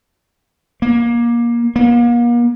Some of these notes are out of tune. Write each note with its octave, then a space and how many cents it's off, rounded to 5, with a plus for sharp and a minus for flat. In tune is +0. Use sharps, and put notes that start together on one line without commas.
A#3 +20
A#3 +40